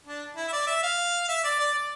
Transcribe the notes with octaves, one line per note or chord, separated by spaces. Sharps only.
D4
E4
E5
D5
E5
F5
E5
D5
D5
D5